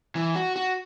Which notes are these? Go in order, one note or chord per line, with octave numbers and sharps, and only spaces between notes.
E3
F#4
F#4